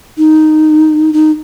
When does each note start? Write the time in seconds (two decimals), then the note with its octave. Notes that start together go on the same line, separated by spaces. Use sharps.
0.18 D#4
1.13 D#4